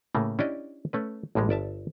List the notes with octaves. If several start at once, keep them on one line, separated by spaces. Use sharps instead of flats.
A2 C#3 A3 A#3
C#4 D4 E4 G4 D5 D#5
A3 C#4 B4
A1 A2 G3 G#3
G1 D5 E5 A5